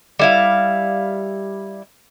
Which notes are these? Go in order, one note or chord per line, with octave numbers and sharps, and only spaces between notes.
G3 E4 F5